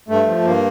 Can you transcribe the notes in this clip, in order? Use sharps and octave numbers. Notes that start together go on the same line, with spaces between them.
G2 A3
F3
G2 A#3